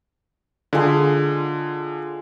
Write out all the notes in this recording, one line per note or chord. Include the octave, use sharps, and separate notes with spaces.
D3 G#3 F4